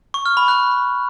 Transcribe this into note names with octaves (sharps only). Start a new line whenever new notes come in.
C#6
F6
B5
F#6